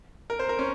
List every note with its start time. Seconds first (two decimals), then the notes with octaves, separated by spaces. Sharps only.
0.30 A#4
0.39 C5
0.49 A#4
0.59 C#4